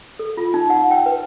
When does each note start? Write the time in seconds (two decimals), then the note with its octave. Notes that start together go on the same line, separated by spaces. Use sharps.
0.19 A4
0.37 F4
0.54 D#4
0.70 F#5
0.91 G5
1.06 B4